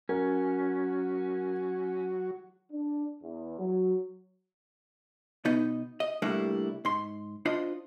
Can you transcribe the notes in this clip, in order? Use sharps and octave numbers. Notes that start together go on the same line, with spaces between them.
F#3 C#4 F#4 A#4
D4
E2
F#3
B2 B3 D#4 D#5
D#5
C2 G3 A3 A#3 D4 E4
G#2 C6
D4 F4 C5 D#5